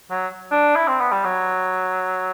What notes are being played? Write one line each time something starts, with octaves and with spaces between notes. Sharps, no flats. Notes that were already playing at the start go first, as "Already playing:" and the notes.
F#3
D4
E4
C4
B3
G3
F#3